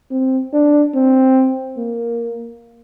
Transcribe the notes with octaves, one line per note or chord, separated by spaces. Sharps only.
C4
D4
C4
A#3